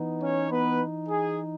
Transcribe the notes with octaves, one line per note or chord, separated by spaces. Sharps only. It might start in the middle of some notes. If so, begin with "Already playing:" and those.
Already playing: E3 B3 D#4
C#4 C#5
B3 B4
G#4